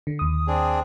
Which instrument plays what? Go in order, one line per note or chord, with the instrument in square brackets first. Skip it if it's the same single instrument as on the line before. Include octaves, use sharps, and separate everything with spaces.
[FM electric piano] D3
D#2 D#6
[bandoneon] C4 D4 G#4